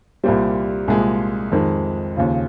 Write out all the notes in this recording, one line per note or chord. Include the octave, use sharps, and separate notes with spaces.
C2 A#2 G3 C5
C2 A#2 F3 G#3 G#4
F2 D#3 G#3
D#2 C#3 F3